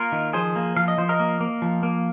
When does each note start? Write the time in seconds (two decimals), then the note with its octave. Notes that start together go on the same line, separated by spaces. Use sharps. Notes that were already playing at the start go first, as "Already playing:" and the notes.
Already playing: A#3 F4 A#4
0.12 D#3
0.33 F3 G#4 C5
0.56 A#3
0.77 F3 F5
0.88 D#5
0.98 F3 C5
1.09 A#4 D#5
1.19 A#3
1.41 A#3
1.62 F3
1.83 A#3